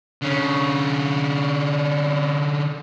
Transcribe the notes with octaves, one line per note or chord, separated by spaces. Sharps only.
D3 C#4